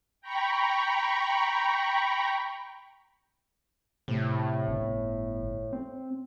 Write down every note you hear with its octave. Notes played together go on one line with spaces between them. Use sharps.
G5 A#5 B5 C#6
A2 C3
G1
C4